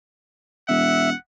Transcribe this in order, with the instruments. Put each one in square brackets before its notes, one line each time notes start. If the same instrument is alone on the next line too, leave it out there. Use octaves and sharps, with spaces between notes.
[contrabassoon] E1 [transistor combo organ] E5 [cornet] F#5